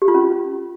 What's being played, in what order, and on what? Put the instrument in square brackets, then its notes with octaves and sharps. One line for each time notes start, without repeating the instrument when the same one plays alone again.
[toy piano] G4
F4
C#4